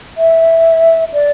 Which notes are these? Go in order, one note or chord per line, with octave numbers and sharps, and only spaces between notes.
E5
D5